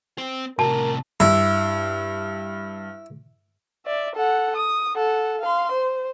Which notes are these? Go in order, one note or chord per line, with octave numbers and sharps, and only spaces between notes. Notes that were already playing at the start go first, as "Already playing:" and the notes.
C4 C5
A2 C3 A#4 A5
G2 E4
D5 E5
A4 F#5
D#6
A4 F#5
F5 C6
C5